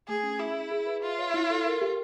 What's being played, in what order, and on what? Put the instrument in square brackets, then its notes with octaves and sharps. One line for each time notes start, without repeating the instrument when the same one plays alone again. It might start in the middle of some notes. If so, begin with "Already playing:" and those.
[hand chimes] A3 [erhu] G#4
[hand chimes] C#4
[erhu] E4 [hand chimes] G#4
[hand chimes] E5
G#4
B4
[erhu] F4 [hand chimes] E5
[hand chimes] C#5
E4
A4
A#4
G4